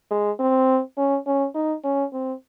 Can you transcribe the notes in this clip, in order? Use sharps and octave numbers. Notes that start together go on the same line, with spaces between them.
G#3
C4
C#4
C#4
D#4
C#4
C4